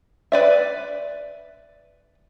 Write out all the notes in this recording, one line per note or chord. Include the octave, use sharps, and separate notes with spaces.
B4 D5 E5